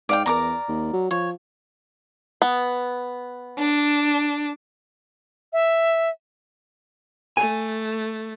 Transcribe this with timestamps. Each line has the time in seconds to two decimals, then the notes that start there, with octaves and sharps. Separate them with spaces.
0.09 G#2 D5 F5 G5
0.26 E2 A#4 D5 A#5
0.68 D#2
0.93 F#3
1.11 F3 C#5
2.42 B3
3.59 D4
5.53 E5
7.37 A3 G#5